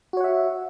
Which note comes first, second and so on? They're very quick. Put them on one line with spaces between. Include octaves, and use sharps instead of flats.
F#4 C#5 F#5 E5